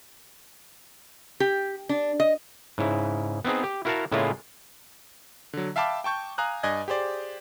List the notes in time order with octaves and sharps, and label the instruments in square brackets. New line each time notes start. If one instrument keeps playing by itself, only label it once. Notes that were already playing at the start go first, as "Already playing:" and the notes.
[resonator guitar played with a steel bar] G4
D4
D#5
[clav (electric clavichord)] G#2 C#3 E4
B3 C4 D#4 G#4
G4
E4 F#4 A#4 F5 F#5 A5
A2 C#3 G#3 A#3 E4 F4
[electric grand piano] D3 F#3
E5 F5 G5 A5 B5 D6
G5 A5 C#6 G6
F5 G#5 A#5 D#6 F#6
G2 D5 D#5 G#5 F#6 G#6
G4 G#4 C5 D5